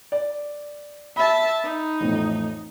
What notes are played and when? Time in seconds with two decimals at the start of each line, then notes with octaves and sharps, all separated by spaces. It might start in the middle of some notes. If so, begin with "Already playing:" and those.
0.12 D5
1.16 E5 A5 B5
1.64 D#4
2.01 A1 F2 A2